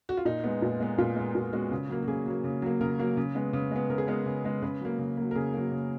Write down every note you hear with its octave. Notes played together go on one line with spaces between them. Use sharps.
F#4
F4
A#2 D#4
G#3 B3
A#2
G#3 B3
A#2 F4
G#3 B3
A#2 F#4
G#3 B3 F#4
C#3
F#3 A#3
F#4
C#3 G#4
F#3 A#3
C#3
F#3 A#3
C#3 A#4
F#3 A#3
C#3
G#3 B3
C#3
G#3 B3
C#3 A#4
G#4
G#3 B3 A#4
C#3
G#3 B3
C#3 B4
F#3 A#3
C#3
F#3 A#3
A#4
C#3 G#4
F#3 A#3
C#3